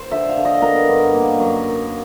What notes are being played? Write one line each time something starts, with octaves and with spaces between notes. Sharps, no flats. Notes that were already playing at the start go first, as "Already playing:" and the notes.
Already playing: C5
D3 E5
F5
D3
D#5
B3 A#4
G2
A#3
F#2